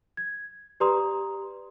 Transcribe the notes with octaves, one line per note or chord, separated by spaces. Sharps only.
G#6
G4 B4 D5 A#5 C6 D#6